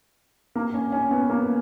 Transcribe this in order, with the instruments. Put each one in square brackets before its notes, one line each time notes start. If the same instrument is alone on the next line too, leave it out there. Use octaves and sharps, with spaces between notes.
[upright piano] A#3
C#4
C#4
B3
A#3